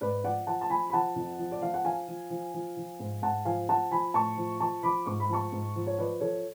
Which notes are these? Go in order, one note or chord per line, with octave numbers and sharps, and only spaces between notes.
G#2 B4 D5
F3 D5 F#5
F3 F#5 A5
A5
F3 G#5 B5
B5
F3 F#5 A5
F2
F3
D5
F3 F5
F#5
F3 F5 G#5
F3
F3
F3
F3
G#2
G#2 F#5 A5
F3 F5 G#5
F3 F#5 A5
F3 G#5 B5
A2 A5 C#6
F3
F3 A5 C#6
F3 B5 D6
G#2 C#6
B5
F3 A5 C#6
G#2
F3
C#5
F3 B4 D5
F3 A4 C#5